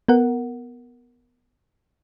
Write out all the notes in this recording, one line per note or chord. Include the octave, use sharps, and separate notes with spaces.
B3 A#4 F#5